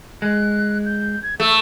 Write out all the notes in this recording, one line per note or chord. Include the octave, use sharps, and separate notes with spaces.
G#3 F#6
G6
G#6
A3 E6